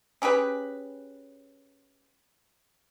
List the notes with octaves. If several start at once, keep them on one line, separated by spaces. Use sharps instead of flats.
C#4 G4 G#4 B4